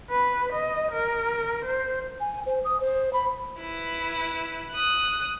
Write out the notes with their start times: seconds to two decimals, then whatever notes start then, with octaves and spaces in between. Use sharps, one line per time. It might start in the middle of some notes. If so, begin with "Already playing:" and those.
0.10 B4
0.53 D#5
0.92 A#4
1.65 C5
2.20 G#5
2.46 C5
2.65 D#6
2.80 C5
3.13 B5
3.60 E4 B4
4.73 D#6 F#6